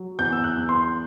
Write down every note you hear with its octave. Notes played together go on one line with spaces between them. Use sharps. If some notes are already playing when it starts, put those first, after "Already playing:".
Already playing: F#3
E2 G6
E6
F#6
E2
C6